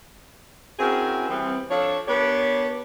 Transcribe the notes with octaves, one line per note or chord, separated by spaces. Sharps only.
C4 C#4 E4 F#4 G#4 A#4
E3 G3 B3 C4
F3 D4 A4 C#5
B3 D4 G4 A#4 C#5